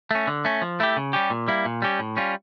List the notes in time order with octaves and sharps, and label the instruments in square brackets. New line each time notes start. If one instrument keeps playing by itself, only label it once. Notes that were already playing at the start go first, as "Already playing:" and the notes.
[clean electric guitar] A3 C#4
D3
A3 C#4
F3
A3 E4 G4
C#3
G3 C#4 G4
A#2
G3 A#3 E4
A#2
G3 C#4 G4
A2
G3 C#4 F4